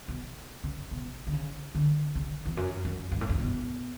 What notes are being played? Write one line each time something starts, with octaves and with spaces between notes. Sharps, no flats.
B2
C#3
B2
D3
C#3
D3
C#3
E2
F#2
F#2
G2
A2
G2
B2